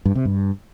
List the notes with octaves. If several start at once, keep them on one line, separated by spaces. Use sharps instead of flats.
G2
C3
G2